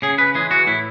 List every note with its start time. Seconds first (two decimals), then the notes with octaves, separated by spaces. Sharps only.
0.02 C#3 G#4
0.18 B4
0.35 E3 G#3 G#4
0.51 F#4
0.67 A2 E4